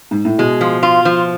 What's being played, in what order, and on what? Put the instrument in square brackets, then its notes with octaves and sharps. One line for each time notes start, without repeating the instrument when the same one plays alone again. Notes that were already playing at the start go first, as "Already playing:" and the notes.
[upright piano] G#2
A2
[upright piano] B2 [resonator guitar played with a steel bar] G#3
[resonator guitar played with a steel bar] F3
F4
F3